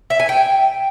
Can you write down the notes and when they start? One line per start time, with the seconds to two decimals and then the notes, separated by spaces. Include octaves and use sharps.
0.10 E5
0.20 G#5
0.29 G5